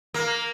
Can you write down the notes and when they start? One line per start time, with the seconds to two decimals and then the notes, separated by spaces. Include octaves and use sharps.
0.14 A#3